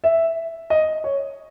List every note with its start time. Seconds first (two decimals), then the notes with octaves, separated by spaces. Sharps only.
0.04 E5
0.70 D#5
1.04 C#5